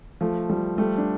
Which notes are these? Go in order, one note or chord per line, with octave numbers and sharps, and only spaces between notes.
F3 A3
F3 G3
G3 A3
D4